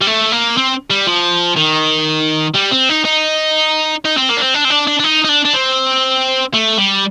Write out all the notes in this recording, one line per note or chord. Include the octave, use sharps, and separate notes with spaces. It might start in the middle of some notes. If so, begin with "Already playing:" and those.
G3
A3
A#3
C4
G3
F3
D#3
G3
C4
D#4
D#4
D#4
C4
A#3
D4
C4
D4
C4
D4
D4
D4
D#4
D#4
D4
D4
C4
A3
G3